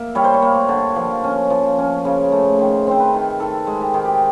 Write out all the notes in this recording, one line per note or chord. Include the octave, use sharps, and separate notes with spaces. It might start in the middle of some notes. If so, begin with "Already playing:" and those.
Already playing: A#3 E5
G3 C#5
C5
C#5
A#3
D3
F3
C#4
F3
C#4
C#3
A3
D#3 C5
C4 C5
B4
D#3
D#3 A4
G#3
G4
D#3 G#4
G4